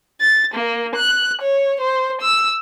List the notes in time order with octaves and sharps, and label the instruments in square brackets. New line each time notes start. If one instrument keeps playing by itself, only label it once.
[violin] A6
A#3
F#6
C#5
C5
E6